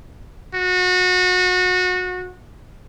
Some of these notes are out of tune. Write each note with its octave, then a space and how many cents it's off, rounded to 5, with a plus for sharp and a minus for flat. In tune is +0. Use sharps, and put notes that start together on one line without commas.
F#4 -25